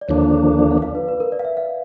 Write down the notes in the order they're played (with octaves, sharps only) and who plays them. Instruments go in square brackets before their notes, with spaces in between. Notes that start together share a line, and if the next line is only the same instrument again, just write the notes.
[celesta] D5
[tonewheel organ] D#2 D3 F3 A#3 D4 [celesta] C#5
[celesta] D5
F5
F5
B4
B4
A#4
D5
F5
E5
F5